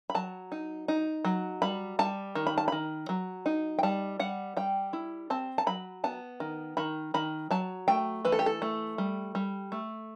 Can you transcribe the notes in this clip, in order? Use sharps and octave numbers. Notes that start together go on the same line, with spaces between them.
B5
F#3 A5
D#4
D#4
F#3
G3 B5
G3 A5
D#3
B5
A5
D#3 B5
F#3
D#4
G5
G3 A5
G3 F#5
G3 G5
E4
C4 A5
A5
F#3 B5
B3 A5
D#3
D#3 B5
D#3 B5
F#3 A5
A3 G5
E3 B4
A4
G4
A4
A3
G3
G3
A3